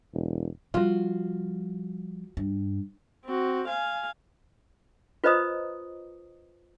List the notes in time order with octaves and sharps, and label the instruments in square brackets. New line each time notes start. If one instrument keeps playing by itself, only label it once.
[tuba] E1
[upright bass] F3 G3 [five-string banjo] F4 F#4
[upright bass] G2
[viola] C4 F#4
F5 G#5
[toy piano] F4 B4 C5 D#5 A#5 D#6